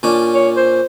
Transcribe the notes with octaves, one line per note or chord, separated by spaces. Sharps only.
A#2 C#4 D4
C#5
C5